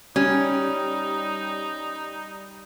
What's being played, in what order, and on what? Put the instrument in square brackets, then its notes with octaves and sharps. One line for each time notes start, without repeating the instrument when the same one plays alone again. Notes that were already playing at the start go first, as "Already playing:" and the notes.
[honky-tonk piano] G3 [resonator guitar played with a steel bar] C#4 [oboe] D#4